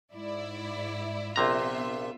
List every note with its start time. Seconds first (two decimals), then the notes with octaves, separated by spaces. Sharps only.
0.14 G#2 E4 D5
1.36 A#1 C3 B3 F4 E5 A#5